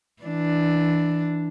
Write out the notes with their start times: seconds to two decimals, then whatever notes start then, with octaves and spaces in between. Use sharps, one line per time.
0.23 E3 D4